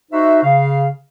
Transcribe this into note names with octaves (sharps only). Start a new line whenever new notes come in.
D#4 F#4 C5 E5
C#3 F5